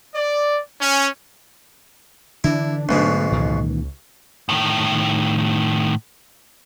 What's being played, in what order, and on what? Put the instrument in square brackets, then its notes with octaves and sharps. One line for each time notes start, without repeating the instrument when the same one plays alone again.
[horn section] D5
C#4
[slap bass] D3 E3 [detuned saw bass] D4 [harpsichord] E4
[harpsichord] B1 G#2 B2 [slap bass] D3 A3 B3
[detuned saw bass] C#2 [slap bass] A#2 D#3 E3
[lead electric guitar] A2 D#3